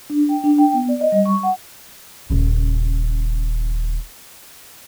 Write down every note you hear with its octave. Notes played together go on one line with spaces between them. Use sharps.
D4
G5
D4
G5
B3
D5
D#5
G3
C#6
F#5
D#1 C#3